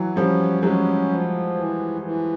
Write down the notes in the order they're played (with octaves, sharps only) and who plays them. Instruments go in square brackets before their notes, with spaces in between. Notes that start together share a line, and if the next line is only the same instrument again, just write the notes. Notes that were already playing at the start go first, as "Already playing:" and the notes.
Already playing: [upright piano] E3 F#3
[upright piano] F3 G3 [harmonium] C#4
[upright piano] F#3 G#3 [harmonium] C#4
[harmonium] F3
E3
E3